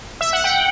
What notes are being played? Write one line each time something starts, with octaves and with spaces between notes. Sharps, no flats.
E5
F#5
G5